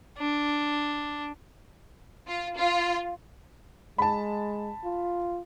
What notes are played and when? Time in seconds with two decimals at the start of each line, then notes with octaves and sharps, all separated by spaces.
0.18 D4
2.28 F4
2.58 F4
3.98 G#3 A5 B5
4.84 F4